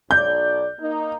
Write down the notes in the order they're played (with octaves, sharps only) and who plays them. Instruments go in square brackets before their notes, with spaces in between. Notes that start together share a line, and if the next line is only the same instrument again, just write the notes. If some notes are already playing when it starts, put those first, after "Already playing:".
[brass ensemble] B1 D5 [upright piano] G6
[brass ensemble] A#3 D#4